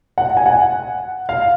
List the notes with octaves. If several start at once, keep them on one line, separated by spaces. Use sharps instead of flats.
F#5
G#5
F#5
F5